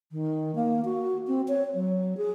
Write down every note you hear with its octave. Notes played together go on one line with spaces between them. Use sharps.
D#3
A#3
F#4
C4
C#5
F#3
G#4